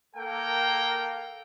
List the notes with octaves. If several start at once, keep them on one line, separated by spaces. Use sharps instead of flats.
A#3 A4 A#4 F5 G5